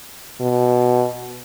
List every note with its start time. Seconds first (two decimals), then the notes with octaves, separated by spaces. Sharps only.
0.40 B2